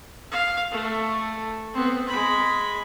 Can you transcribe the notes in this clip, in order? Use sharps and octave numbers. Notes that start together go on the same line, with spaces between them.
F5
A3
B3 C4
G#3 B5